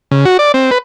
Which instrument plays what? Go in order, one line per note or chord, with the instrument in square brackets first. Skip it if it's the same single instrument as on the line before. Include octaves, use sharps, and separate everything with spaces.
[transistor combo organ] C#3
F#4
D5
C4
B4